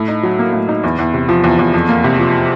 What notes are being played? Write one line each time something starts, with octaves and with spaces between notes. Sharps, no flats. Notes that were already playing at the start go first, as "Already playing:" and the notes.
Already playing: A2
D#4
F#3
A#3
A2
D#4
E2
E2
C3
F3
E2
E2
F2
A#3
C3
F3